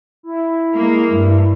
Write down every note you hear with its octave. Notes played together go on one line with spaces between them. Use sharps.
E4
G#3 A#3
G2